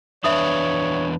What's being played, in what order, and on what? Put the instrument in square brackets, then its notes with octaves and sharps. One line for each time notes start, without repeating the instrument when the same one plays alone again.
[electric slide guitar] E2 D4 B4 [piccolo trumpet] C#5 [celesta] E5 D#6